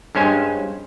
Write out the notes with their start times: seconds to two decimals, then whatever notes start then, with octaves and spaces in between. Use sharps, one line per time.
0.15 G2 G#3 C#4 C5 G#5